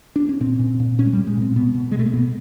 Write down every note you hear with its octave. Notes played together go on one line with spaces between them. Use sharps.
D4
C#4
A#2 C4
A#2
A#2
A#2 C#4
G#3
A#2 G3
G#3
A#2 C4
B2 B3
B2
G#3
B2 A3
A#3
B2 B3